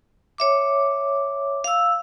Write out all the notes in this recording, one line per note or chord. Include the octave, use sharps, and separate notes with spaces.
C#5 E5 D6
F5 E6